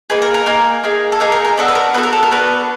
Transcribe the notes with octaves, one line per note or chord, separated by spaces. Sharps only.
A#3 D#4 G#4 B4
A#4
A#4
A#3 D#4 G#4
A#3 D#4 G#4
A4
A#3 D#4 G#4 A#4
A#4
A#4
B3 D4 F#4 A4
B4
A#4
B3 D4 F#4 A4 B4
A#4
A4
A#4
B3 D4 F#4 A4 B4